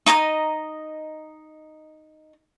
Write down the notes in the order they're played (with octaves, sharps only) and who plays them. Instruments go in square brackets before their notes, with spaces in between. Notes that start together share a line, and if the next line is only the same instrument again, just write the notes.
[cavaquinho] D#4 D#5 A#5 D#6